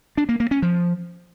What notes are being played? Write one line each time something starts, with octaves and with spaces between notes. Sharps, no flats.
D4
A#3
A#3
C#4
F3